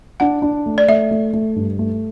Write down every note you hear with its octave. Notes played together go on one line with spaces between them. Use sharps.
D4 F#5
D4
A3
D5
A3 E5
A3
A3
G2
A3